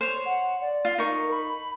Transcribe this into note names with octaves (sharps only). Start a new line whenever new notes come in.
C5 C#5
F#5
D5
F4
D#4 A#4 C#6
B5